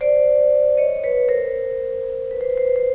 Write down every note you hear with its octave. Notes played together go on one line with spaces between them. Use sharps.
C5 D5
C#5 D#5
B4 C#5
A#4 C5
B4
C5
B4
C5
B4
C5